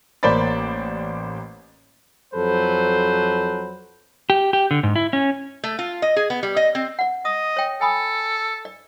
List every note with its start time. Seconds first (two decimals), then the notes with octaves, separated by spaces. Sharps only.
0.23 A1 A#3 C5 D5 B5 A6
2.34 F2 F#3 A4 B4 C5
4.30 G4
4.53 G4
4.71 D3
4.83 G#2
4.96 E4
5.13 C#4
5.64 A3
5.79 F4
6.02 D#5
6.16 G#4
6.30 B3
6.43 G3
6.56 D#5
6.75 C4
6.99 D5 F#5
7.25 D#5 D#6
7.57 C#5 G5
7.81 A4 G#5 B5 D#6
8.65 D5